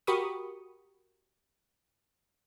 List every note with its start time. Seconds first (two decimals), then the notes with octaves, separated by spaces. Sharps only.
0.07 F#4 G4 A#4 B5 C#6 D#6